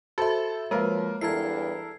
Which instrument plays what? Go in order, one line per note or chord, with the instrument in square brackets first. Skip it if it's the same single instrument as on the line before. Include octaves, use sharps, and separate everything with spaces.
[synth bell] F#4 E5 [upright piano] A4 C5
[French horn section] F3 [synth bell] G#3 [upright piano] A#3 A#4 B4
[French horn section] E2 G2 E3 [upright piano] E4 A4 A#4 [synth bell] G#6 C7